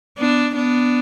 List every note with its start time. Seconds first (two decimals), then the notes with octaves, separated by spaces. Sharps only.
0.18 B3 D4
0.55 B3 D4